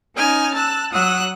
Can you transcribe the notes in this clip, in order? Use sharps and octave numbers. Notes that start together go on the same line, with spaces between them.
C#4 D#4 G#5 F6
A5 E6 F#6
F#3 F#5 D#6 E6 F#6